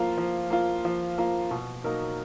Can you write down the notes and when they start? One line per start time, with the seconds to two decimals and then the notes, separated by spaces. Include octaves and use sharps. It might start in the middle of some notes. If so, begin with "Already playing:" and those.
Already playing: F3 A#3 F4
0.18 F3
0.50 A#3 F4
0.85 F3
1.18 A#3 F4
1.51 B2
1.84 F#3 A#3 D#4 A#4